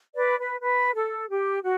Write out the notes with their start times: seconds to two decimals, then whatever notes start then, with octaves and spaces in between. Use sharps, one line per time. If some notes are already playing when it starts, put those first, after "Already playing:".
0.15 B4 D5
0.38 B4
0.60 B4
0.94 A4
1.29 G4
1.62 F#4